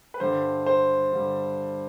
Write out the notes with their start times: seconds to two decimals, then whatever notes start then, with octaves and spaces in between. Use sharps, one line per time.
0.14 B4
0.20 G2 D3 G3 C5
0.66 C5
1.13 G2 D3 G3